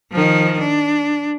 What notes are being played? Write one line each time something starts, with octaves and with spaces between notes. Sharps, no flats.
D#3 F3
D4